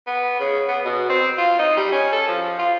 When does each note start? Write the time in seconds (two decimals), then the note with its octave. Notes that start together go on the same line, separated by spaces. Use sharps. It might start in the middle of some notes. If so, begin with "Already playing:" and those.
0.07 B3
0.40 C#3
0.69 B3
0.85 B2
1.10 C4
1.38 F4
1.59 D#4
1.77 G3
1.92 C#4
2.12 A4
2.28 F3
2.59 F4